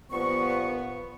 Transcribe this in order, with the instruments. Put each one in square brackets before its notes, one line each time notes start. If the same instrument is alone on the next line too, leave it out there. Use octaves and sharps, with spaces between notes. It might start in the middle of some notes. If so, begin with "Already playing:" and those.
[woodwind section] G2 F3 C#6 [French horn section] A#2 B3